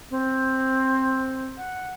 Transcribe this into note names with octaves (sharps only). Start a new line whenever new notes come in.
C4
F#5